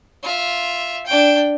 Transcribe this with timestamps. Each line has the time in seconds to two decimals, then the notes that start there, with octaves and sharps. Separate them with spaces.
0.23 F4 E5
1.06 D4 G5